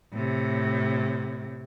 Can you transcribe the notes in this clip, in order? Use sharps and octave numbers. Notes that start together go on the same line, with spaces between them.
A2 C3